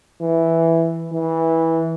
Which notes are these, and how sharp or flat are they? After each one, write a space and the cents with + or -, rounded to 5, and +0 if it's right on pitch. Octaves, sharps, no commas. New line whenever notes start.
E3 +0
E3 -15